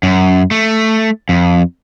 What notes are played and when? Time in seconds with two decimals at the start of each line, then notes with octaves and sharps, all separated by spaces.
0.03 F#2
0.51 A3
1.29 F2